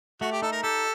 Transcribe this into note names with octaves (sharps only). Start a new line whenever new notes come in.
A3 F#4
G4
D#4 A4
A#4
G4 A4